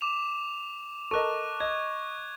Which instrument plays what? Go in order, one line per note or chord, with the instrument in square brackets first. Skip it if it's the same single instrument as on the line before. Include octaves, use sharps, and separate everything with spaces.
[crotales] D6 E7 F7
[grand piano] A4 A#4 D#5 [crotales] C#6 F#6
[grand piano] D#5 [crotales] G#6